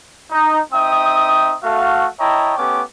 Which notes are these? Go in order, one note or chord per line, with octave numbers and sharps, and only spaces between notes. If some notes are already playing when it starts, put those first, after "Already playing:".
D#4
C4 D#4 E5 G5 D#6
A3 F#4 F5
E4 C#5 D#5 G5 A5 A#5
A3 B3 C#4 G4 D6